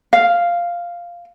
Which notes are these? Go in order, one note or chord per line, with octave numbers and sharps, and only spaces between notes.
F5